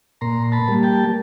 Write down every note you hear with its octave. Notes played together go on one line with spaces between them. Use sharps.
A#2 A#5 C6
A5 B5
G3 A#3
G5 A5